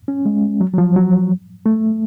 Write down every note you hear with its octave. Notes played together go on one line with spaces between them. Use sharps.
C#4
G#3
F#3
F#3
F3
F#3
A3